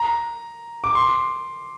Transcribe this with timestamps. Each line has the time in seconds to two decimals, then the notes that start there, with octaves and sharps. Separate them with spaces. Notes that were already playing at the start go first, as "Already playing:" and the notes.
Already playing: A#5
0.84 D6
0.95 C6